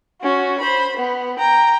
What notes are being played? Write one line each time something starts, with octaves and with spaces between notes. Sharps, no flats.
C#4 F#4
C5 B5
B3
G5 A#5